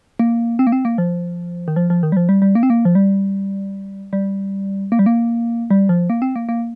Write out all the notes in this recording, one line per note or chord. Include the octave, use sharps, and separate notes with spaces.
A#3
C4
A#3
C4
A#3
F3
D#3
F3
F3
D#3
G3
F3
G3
G3
A#3
C4
A#3
F3
G3
G3
A#3
G3
A#3
G3
F3
A#3
C4
A#3
A#3